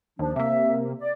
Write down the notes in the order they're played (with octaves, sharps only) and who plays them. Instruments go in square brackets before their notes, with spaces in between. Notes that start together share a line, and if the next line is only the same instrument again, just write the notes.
[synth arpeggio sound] D#2 [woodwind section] F3 D4
[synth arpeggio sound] C3 A#3 [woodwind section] E5
[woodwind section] D5